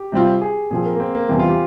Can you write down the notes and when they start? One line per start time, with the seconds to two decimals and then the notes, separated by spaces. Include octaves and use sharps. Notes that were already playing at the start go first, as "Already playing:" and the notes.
Already playing: G4
0.12 C3 G3 C4 F4
0.42 G#4
0.71 A#2 F3 C4 G#4
0.86 A#4
0.96 A#3
1.00 C4
1.15 A#3
1.29 E2 C3 E3 G3 C4
1.39 F4
1.49 G4